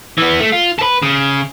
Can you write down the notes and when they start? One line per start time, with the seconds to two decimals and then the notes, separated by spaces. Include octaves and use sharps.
0.18 E3 B3
0.40 A3
0.52 F4
0.79 A4 B4
1.03 C#3